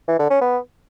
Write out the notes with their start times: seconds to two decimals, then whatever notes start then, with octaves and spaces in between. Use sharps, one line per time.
0.08 E3
0.19 D3
0.30 C#4
0.41 B3